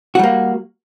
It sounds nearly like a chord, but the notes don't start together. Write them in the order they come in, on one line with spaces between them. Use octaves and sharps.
F#4 G3 A#3